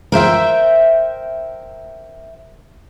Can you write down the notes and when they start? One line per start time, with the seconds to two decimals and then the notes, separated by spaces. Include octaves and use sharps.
0.12 A#4 C5 E5 G5